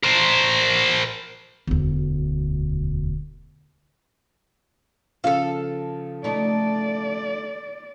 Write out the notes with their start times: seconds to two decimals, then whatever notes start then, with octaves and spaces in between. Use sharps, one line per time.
0.04 A#4 C5
1.67 E1 D2
5.24 C#3 F3 A4 F5
6.24 A3 D#4 D5